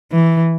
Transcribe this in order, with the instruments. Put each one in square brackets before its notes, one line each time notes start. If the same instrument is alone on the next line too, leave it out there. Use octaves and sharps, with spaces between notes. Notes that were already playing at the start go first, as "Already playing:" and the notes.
[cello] E3